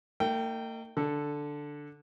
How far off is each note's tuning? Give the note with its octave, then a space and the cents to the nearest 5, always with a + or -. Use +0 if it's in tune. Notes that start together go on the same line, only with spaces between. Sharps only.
A#3 -45 D#4 +0 G5 -10
D3 +0 A4 +0